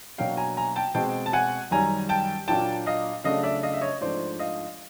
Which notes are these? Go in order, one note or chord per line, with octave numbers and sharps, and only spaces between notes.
B2 F#3 A#3 D4 F5 G5
G#5 A#5
G#5 A#5
G5 A5
B2 G#3 C4 G5 A5
A5
F#5 G#5
F#2 D#3 G3 G#5 A#5
G5 A5
A#2 F#3 A#3 D4 G5 A5
D#5 F5
C#3 F#3 A3 D4 D#5 F5
D5 E5
D#5 F5
E5
C#5 D#5
G#2 F3 A3 D4 C5 D5
D#5 F5